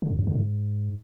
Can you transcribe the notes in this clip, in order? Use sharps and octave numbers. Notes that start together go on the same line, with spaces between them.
D3
F2
F#2
D3
G#2